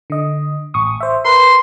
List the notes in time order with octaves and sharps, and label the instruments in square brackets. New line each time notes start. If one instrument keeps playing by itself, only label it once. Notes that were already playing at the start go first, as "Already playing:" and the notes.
[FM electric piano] D3 D#5
A1 C#6 D#6
C5 E5
[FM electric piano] A#4 B4 [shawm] C6